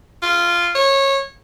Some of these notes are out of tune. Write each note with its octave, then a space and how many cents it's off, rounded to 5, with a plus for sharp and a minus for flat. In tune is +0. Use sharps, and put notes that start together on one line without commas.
F4 -10
C#5 -20